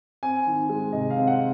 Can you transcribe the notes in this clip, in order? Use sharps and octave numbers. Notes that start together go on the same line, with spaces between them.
C4 G#5
D#3
G#3
C3 D#5
F5
C4
F#5